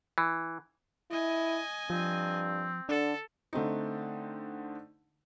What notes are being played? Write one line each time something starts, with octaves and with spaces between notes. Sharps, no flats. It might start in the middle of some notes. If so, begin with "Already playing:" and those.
E3
E4 D#5 G#5
G2 F3 C4
D3 D4 A4
D3 A3 C4 D#4